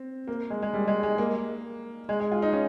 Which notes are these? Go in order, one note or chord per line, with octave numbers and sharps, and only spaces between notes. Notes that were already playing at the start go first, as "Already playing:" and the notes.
Already playing: C4
A#3
G#3
G#3
G3
G#3
G#3
A#3
G#3
G#3
F4
D#4
C#4